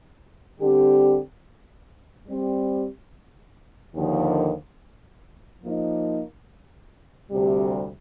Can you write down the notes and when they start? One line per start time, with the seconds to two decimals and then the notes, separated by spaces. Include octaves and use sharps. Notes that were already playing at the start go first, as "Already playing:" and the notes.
0.60 D3 G3 C4 G4
2.27 G3 C4 G4
3.95 D#2 D3 F3
5.62 F3 A#3 D#4
7.30 D2 C3 G3